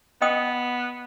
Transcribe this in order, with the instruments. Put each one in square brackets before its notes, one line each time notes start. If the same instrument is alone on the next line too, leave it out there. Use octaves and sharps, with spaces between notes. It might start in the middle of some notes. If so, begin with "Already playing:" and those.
[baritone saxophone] B3 [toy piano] D#5 G5 D#6